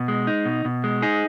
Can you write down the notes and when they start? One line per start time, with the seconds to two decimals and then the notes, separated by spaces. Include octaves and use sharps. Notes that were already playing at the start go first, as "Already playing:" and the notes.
Already playing: B2
0.08 G#3
0.27 D#4
0.45 B2
0.65 B2
0.84 G#3
1.02 D#4 G#4